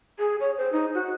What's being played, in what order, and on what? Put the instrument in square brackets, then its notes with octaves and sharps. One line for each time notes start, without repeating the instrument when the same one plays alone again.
[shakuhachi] G#4
C#5
C5
D#4
F#4